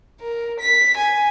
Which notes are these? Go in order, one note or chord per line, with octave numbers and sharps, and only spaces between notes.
A#4
B6
G#5